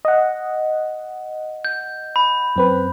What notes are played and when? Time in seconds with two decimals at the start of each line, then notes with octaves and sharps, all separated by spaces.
0.05 D#5 F#5
1.65 G6
2.16 B5
2.56 F#2 C4 B4